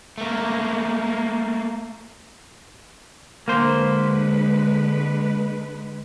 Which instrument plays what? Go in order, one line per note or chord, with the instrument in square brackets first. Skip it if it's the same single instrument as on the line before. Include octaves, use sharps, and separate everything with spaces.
[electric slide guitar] A3 A#3
[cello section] D3 G#3 B4 [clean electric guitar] A#3 C5